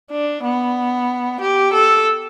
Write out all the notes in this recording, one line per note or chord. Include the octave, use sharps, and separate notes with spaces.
D4
B3
G4
A4